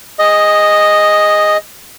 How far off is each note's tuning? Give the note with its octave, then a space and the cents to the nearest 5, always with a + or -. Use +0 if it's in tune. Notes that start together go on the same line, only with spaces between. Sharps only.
G#4 -20 D#5 +0